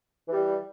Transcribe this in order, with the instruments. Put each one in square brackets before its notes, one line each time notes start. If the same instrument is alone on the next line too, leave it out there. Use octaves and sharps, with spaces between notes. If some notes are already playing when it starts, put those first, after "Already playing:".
[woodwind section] E3 G3